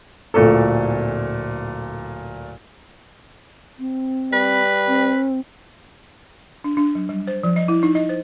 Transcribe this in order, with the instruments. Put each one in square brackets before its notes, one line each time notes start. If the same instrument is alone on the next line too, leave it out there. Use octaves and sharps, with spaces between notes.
[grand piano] D1 A#2 A3 A4
[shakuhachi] C4
[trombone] G3 [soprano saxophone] B4
[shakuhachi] C4
[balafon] D4
D4
F#3
G3
C5
F3
D#5
E4
D#4
D#5
C5